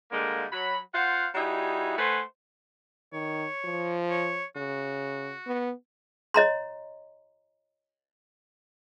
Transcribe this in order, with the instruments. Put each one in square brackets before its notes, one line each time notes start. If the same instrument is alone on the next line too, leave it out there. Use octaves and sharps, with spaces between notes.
[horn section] D3 G3 G#3 A#3
F#3 B5
F4 C5 F5 F#5
G3 D#4 E4 F#4 G#4
A3 B4 C5 F#5 G#5
[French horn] D#3 [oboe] C#5
[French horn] F3
[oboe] C#5
[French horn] C#3 [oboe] F#4
[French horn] B3
[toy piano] C#5 D#5 A#5 C6